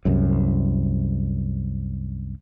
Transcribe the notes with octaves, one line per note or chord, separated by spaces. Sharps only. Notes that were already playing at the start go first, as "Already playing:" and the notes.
C2 F#2